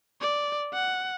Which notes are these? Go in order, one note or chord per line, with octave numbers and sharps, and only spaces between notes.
D5
F#5